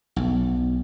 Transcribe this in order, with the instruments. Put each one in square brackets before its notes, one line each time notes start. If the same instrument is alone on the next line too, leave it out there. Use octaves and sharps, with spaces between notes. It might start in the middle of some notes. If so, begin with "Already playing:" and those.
[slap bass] B1